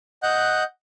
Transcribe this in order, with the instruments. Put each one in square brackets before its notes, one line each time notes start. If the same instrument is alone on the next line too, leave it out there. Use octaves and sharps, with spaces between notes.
[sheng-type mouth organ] D#5 F#5 F#6 G6